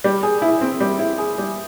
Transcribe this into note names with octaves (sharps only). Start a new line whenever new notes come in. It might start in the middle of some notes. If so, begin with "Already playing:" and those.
G3
G#4
E4
C4
G3
E4
G#4
G3